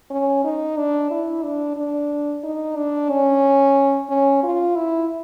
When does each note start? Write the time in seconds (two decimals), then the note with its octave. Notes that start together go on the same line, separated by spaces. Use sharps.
0.10 C#4
0.44 D#4
0.77 D4
1.11 E4
1.43 D4
1.76 D4
2.44 D#4
2.76 D4
3.10 C#4
4.09 C#4
4.43 F4
4.76 E4